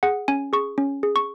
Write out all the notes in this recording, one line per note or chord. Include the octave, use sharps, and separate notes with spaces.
G#4 F#5
C#4 G#5
G#4 C#6
C#4
G#4
C#6